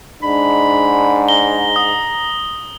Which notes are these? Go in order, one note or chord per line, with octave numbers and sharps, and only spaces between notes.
G#2 D4 B5
A#5 G7
D#6